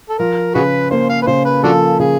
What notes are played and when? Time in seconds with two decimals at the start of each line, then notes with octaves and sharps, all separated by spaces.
0.09 A4
0.19 F3 A#4
0.55 C#3 F#4 G#4 B4
0.91 A#3 C5
1.10 F5
1.22 B4
1.27 C#3 C5
1.45 B4
1.64 F3 D4 F#4 A4
1.99 C#3 G#4